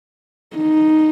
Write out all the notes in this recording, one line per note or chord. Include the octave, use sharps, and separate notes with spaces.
D#4